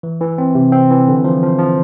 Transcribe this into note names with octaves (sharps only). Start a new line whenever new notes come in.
E3
E3
C4
C3
C4
E3
D3
F3
F3
F3